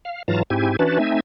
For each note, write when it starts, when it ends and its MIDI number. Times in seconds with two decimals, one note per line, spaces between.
0.05 0.23 77
0.28 0.43 44
0.28 0.43 52
0.28 0.43 54
0.28 0.43 65
0.28 0.43 81
0.28 0.43 82
0.50 0.77 44
0.50 0.77 60
0.50 0.77 64
0.50 0.77 67
0.50 0.77 80
0.79 0.98 52
0.79 0.98 61
0.79 0.98 62
0.79 0.98 66
0.79 0.98 71
0.79 0.98 81
0.99 1.20 57
0.99 1.20 60
0.99 1.20 63
0.99 1.20 76
0.99 1.20 80